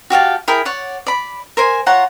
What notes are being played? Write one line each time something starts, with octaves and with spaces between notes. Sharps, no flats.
F#4 G4 F5 A5
E4 G#4 A#4 G5
C#5 D5 F#5
D5 B5
A#4 C5 G#5
F4 C#5 F#5 A#5